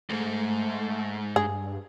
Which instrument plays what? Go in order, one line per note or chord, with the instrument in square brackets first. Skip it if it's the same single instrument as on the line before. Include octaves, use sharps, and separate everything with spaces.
[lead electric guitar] D2 G#2 [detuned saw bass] A3
[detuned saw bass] G2 [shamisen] G#4